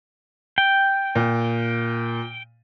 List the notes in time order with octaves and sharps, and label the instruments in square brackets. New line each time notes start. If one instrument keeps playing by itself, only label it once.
[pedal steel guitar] G5
[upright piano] A#2